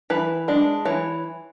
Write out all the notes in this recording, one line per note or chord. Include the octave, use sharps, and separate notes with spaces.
E3 B4
G#3 D4
E3 C#5